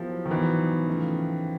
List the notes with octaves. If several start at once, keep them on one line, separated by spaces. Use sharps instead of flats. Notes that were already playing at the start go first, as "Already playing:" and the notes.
Already playing: F3 F#3 B3 E4 G4 A#4
D#3
B2 E3 F#3 B3 D#4
C#3 F3 A3